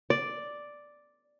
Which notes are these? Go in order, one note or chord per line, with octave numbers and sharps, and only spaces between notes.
D5